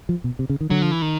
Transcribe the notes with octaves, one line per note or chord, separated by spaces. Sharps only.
F3
B2
C3
C#3
D#3
D3 F#3
F3
E3
D#3